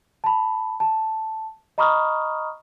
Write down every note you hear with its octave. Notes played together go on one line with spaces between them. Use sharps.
A5 B5
A5
D#5 A#5 B5 C#6 D#6 F6